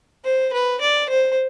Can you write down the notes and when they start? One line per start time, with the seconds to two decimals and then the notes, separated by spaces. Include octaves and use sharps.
0.24 C5
0.53 B4
0.81 D5
1.09 C5